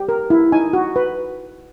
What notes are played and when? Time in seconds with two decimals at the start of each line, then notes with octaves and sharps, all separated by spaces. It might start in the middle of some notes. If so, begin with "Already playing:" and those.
Already playing: G4
0.09 A#4
0.30 E4
0.52 D#4 G#5
0.73 F#4
0.96 B4